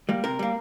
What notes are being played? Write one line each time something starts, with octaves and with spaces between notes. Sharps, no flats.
G3 A#3
C3 A#4
G3 A#3